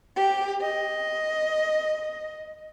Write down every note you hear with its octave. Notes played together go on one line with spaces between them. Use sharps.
G4
D#5